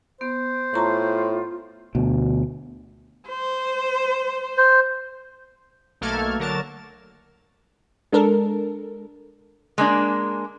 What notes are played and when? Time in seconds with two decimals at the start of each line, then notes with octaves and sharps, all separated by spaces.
0.21 B3 C5
0.74 A2 F4 A5 A#5 C#6
1.95 D2 B2
3.29 C5
4.57 C5
6.01 B1 A3 A#3 A4 F6 G#6
6.39 D3 F#3 A#4 A5 A6
8.12 G#3 D4 A4 A#4
9.78 G#3 A#3 D4